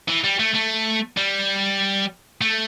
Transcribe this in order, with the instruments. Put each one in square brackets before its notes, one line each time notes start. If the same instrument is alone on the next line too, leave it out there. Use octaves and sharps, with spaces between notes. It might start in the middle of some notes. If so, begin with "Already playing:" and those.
[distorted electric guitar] E3
G3
A3
A3
G3
A3